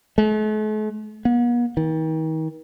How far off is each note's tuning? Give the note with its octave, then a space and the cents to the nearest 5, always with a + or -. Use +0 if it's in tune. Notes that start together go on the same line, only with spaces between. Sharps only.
A3 -45
B3 -45
D#3 +40